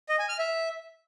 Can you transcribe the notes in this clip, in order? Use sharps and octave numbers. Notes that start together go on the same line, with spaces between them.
D#5
G#5
F6
E5